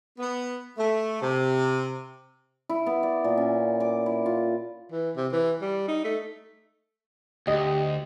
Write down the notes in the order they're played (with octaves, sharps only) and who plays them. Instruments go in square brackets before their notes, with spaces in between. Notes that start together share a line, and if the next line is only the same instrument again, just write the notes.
[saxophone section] B3
A3
C3
[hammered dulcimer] E4
B3
D5
A#2
C#4
D6
E4
F4
[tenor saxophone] E3
C3
E3
G3
D#4
A3
[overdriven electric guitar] D2 [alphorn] G4 [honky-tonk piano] D#5